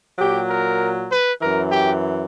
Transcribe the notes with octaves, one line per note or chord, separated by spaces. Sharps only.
A#2 F#3 G4
A#4
B4
F#2 E3 A#4
G4